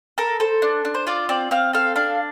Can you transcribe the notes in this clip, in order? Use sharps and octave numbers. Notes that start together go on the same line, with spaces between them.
A4 A#4
A4 C5
D4
D4
C5
F4 D5
C4 D5
C4 F5
A4 F5
D4 F5